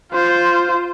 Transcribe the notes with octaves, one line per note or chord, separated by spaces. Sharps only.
F4 C5